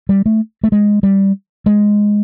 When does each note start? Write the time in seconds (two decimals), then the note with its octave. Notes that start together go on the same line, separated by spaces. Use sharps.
0.09 G3
0.26 A3
0.64 A3
0.72 G#3
1.03 G3
1.66 G#3